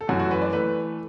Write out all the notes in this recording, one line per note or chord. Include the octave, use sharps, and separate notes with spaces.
A4
F#2 E3 A3 F#4
F#4
B4
D5
E3 A3 B4